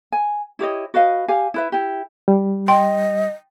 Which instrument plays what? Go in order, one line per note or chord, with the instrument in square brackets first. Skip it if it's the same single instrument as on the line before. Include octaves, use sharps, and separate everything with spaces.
[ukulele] G#5
E4 G4 C#5 D#5
F#4 B4 D#5 F5
G4 F5 G#5
E4 B4 E5
E4 G4
[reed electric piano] G3
[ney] D#5 [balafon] G5 C6